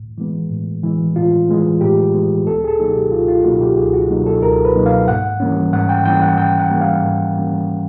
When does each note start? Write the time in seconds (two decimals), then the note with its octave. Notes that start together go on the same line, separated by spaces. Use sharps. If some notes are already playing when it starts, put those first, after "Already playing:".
Already playing: A2
0.18 E3 G#3 B3
0.50 A2
0.83 E3 G#3 B3
1.16 A2 F4
1.48 E3 G#3 B3
1.81 A2 G4
2.14 E3 G#3 B3
2.47 C#2 A4
2.64 G#4
2.68 A4
2.79 B2 F#3 A#3 D#4
2.90 G4
3.12 C#2 F4
3.28 F4
3.44 B2 F#3 A#3 D#4 F#4
3.61 G4
3.76 C#2 G#4
3.93 F#4
4.10 B2 F#3 A#3 D#4
4.26 A4
4.42 C#2 A#4
4.65 B4
4.75 B2 F#3 A#3 D#4
4.86 F5
5.08 G#2 F#5
5.40 E3 G3 A#3 C#4
5.73 G#2 F#5
5.89 G5
6.05 E3 G3 A#3 C#4 G5
6.22 F#5
6.38 G#2 G5
6.60 F#5
6.71 E3 G3 A#3 C#4
6.81 F5
7.04 G#2
7.36 E3 G3 A#3 C#4